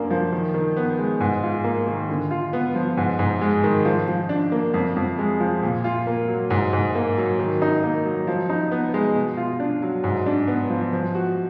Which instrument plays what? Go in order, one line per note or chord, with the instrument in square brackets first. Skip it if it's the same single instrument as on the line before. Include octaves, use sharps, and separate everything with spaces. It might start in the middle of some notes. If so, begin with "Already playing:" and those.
Already playing: [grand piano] F#2 A#3 D4
F3
D#3
D#3
B3
G#3
G#2
F4
A#3
D#3
D3
F4
B3
F3
G#2
G#2
G#3
D#3
F3
F3
D4
A#3
F2
F2
G#3
F3
A#2
F4
A#3
F#3
G#2
G#2
A#3
F#3
D#3
D#4
A#3
F#3
F3
D#4
B3
G#3
B2
F4
D4
F#3
G#2
D4
B3
F3
F3
F#4